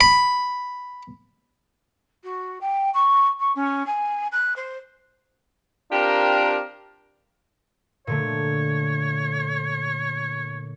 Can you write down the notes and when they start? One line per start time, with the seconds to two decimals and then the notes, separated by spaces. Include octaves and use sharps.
0.01 B5
2.23 F#4
2.61 G5
2.94 C#6
3.40 C#6
3.55 C#4
3.86 G#5
4.32 F#6
4.56 C5
5.92 C4 D4 F4 G4 A#4
8.07 A#2 D3 A3 C#5